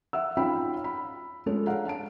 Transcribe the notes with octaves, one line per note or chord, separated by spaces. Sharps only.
E5 F#5 E6
C#4 D#4 F4 F5 G5 B5
B5
G#3 C#4 F4 G#4 A4 C#5
D4 F5 F#5 A#5
F5 A5 D7